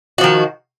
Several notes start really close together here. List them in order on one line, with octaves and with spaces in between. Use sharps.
F#4 F3 D#3